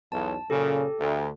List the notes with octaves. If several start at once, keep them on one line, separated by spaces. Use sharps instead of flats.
B1 E2 A5
F#2 A#2 C#3 G4 A4
D2